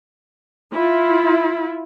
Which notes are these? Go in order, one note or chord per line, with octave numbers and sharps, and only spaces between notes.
E4 F4